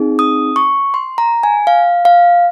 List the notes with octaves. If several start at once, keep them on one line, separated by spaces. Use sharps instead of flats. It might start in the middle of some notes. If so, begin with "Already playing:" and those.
Already playing: C4 D#4 G#4
D#6
C#6
C6
A#5
G#5
F5
F5